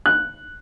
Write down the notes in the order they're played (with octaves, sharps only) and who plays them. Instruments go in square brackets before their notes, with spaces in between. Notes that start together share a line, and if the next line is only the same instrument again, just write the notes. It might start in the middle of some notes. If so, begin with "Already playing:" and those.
[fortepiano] F#6